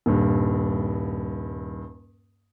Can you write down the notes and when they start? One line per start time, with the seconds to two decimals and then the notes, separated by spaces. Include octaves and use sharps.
0.06 D#1 G2